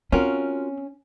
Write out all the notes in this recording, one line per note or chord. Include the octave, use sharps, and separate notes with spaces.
C4 C#4 F4 F#4 A#4